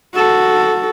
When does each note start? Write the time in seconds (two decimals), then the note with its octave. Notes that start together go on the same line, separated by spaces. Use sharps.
0.15 F#4 A4